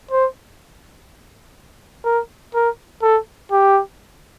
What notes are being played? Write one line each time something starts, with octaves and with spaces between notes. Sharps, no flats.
C5
A#4
A#4
A4
G4